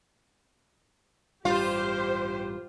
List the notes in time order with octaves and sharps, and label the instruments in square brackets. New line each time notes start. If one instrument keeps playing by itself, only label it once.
[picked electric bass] A1 G2 G3 [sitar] F4 [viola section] G4 C5